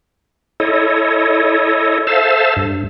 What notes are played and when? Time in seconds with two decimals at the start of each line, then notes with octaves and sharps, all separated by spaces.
0.60 E4 A4 C#5 D#5
2.07 A4 C5 E5 F5 A5
2.56 G2